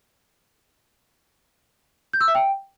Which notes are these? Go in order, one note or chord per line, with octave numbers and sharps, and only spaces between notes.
G6
E6
E5
G5